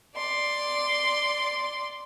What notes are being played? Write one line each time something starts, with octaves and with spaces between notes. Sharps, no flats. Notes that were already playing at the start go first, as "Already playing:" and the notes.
D5 C6